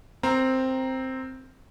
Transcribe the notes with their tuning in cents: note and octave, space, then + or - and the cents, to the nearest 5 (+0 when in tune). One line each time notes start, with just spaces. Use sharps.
C4 +0 A#4 +0 A#5 +0